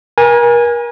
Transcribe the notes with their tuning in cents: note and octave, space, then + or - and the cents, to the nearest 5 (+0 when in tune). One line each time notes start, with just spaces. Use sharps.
A#4 +35 G#5 -15